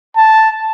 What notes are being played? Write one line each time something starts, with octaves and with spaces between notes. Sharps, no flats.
A5